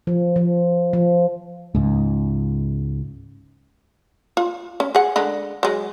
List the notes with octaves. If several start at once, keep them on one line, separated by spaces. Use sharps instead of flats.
F3
F3
F3
C#2 G#2
F4
C#4
G#4 F#5
D3 G#3 B5
F#3 G#3